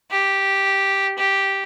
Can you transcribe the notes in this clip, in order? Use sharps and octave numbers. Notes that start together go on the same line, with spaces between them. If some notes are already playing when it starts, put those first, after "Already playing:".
G4
G4